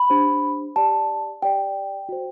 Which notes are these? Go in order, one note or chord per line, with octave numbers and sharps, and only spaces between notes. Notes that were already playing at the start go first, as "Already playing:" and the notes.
Already playing: B5
D4 G4 C5
G4 D5 A5
G4 D5 G5
F#4 C5